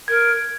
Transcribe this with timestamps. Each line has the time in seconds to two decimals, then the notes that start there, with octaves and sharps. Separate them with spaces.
0.08 A#4 G#6